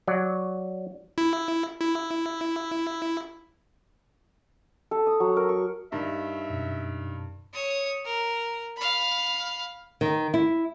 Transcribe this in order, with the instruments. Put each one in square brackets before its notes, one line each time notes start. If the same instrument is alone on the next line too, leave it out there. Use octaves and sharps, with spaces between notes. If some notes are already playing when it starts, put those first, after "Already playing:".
[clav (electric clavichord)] F#3 D5
[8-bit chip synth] E4
E4
[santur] A4
D#6
F#3
A#4
C#6
[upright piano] G2 D#3 [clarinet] E5
[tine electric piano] F#2 B2
[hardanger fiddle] C#5 D#6
A#4
F5 B5
[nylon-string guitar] D#3
E4